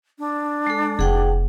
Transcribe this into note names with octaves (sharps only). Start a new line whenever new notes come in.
D4
G#3 A4
F1 G#4 F#5 G5